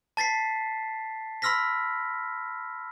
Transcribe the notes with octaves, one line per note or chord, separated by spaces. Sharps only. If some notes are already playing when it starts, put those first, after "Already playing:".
A5 A6 B6 C7
B5 C6 E6 F6 A#6 B6